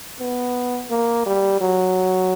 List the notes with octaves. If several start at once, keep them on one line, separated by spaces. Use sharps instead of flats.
B3
A#3
G3
F#3